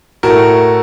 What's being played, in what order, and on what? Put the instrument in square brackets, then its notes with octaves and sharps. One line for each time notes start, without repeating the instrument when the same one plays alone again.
[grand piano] A2 A3 F#4 A#4